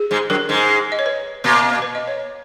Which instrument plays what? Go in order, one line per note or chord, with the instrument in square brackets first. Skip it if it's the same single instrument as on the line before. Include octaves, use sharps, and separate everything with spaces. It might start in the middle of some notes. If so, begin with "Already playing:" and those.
Already playing: [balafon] G#4
[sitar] G#2 G#3
[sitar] F#2 F#3 [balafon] A#4
[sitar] G#2 G#3
[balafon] D#5
C#5
B4
[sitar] A#2 A#3
[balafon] B4
D#5
C#5